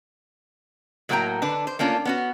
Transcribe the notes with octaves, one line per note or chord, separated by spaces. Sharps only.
A2 F#3 A#3 B3 G5 A#5
D3 D4 B4
C5
A3 A#3 C#4 D4 F4
B3 C#4 F#4